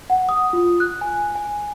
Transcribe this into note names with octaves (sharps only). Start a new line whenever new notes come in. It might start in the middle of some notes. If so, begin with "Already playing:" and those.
F#5
D#6
F4
F#6
G#5
G#5